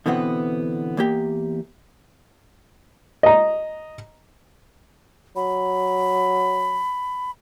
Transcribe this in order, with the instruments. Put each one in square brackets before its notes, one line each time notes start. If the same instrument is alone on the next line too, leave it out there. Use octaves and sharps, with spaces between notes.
[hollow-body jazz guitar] B2 D3 E3 B3 C4 F#5
E2 A#3 G4
[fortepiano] D#5 A#5
[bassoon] F#3 [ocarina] B5